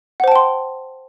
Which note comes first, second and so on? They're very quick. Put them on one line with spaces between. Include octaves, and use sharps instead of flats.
F#5 C5 A5 G5 C6